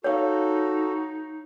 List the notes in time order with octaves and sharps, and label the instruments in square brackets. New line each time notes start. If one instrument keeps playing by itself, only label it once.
[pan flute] D#4 [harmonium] F#4 A4 [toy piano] C#5 F5